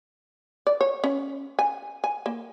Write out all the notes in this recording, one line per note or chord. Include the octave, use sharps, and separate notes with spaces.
D5
C#5
C#4
G#5
G#5
A#3